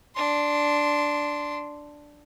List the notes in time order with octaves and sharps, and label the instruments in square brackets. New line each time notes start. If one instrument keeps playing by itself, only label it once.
[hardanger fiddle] D4 C6